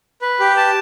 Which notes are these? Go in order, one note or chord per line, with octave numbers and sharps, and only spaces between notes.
B4
G4
A5